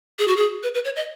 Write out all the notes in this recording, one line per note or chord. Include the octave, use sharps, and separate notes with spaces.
G#4
F#4
G#4
B4
B4
C#5
D#5